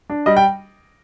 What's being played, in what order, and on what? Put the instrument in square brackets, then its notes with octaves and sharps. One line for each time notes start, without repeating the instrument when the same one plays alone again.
[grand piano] D4
G3 D#5
G5